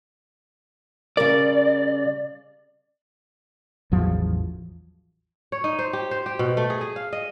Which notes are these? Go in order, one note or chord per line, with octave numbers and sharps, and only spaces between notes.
C#3 G3 A#4 D5
A1 E2 F3 F#3
C#5
D#4
C5
G4
C5
G4
B2
A3
G#4
G#4
F5
D#5